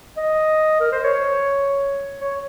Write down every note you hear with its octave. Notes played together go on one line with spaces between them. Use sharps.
D#5
A#4
C5
C#5
C#5